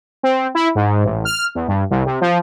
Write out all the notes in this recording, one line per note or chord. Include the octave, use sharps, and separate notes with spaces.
C4
E4
G#2
A1
F6
E2
G2
C2
C3
F3